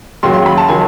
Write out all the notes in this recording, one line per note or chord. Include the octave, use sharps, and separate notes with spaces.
D#2 C#3 F#3 C6
C6
B5
A5
D#3 F#3 G#5